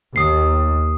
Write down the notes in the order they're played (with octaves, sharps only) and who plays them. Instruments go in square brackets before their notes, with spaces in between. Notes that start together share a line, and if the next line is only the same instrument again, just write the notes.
[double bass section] D#2 [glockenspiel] D#6 C7